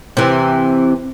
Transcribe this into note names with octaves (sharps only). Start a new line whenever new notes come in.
C3 E3